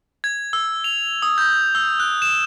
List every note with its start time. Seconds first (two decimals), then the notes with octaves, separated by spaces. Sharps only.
0.24 G#6
0.53 E6
0.84 F7
1.22 D#6
1.38 G6
1.75 E6
2.00 F#6
2.22 E7